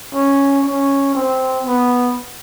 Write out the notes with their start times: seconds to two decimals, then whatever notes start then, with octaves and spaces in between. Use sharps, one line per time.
0.14 C#4
0.65 C#4
1.15 C4
1.66 B3